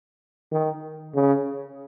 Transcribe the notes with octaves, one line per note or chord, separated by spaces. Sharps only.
D#3
C#3